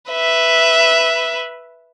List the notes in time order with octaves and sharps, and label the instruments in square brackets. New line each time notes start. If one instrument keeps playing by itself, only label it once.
[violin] B4 E5